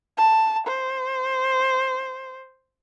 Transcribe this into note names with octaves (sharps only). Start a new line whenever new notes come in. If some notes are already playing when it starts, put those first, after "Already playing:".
A5
C5